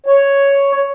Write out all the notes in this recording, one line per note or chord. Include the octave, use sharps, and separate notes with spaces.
C#5